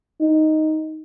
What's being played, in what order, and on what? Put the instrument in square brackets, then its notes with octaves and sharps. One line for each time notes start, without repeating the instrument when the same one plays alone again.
[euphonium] D#4